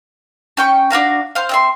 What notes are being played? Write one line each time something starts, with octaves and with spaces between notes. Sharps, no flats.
C#4 G5 C#6
D4 F#4 F5 A#5
C5 F5
C4 E5 C6